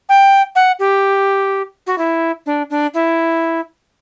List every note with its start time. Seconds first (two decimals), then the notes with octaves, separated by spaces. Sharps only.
0.09 G5
0.55 F#5
0.79 G4
1.87 F#4
1.98 E4
2.46 D4
2.70 D4
2.94 E4